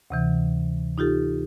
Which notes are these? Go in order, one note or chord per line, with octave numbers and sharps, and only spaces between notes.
D2 C3 E3
D#4 F4 G4 A4